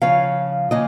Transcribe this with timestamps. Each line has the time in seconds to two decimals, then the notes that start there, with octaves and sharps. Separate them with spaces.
0.02 C#3 F3 C#4 C#5 F5
0.71 C#3 F3 A#3 D#5 G#5